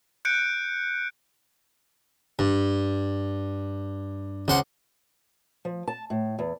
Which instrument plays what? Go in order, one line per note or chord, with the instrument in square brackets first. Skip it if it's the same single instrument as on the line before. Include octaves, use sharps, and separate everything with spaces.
[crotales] F#6 G6 C#7 D7
[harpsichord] G2
C#2 C5 F#5
[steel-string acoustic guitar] F3
A5
A2
E2